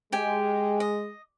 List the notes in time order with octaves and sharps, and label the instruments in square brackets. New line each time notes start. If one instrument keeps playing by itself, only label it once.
[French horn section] G#3 [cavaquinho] G4 G5 G#5
[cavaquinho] D#5